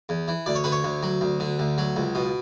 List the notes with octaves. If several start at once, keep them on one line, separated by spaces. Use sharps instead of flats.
E2
E3
D2 D5
C#5
D3 B4
C#5
D2
F#3
D2
D3
D2
F#3
C#2
B2